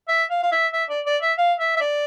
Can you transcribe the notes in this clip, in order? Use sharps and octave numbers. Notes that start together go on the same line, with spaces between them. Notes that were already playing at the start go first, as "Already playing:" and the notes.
E5
F5
F5
E5
E5
D5
D5
E5
F5
E5
E5
D5